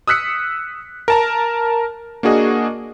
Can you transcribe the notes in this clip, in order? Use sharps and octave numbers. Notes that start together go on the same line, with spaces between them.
D#6 E6 F#6 B6 C#7
A#4 A5 A#5
A#3 D4 F#4 G#4 D#5